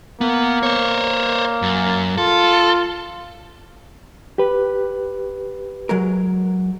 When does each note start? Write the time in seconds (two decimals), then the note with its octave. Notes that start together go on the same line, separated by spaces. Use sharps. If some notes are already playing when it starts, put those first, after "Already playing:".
0.21 A#3 B3
0.63 C5 C#5
1.62 F#2
2.18 F4 A4
4.38 G4 B4
5.89 F#3 G#3 A#4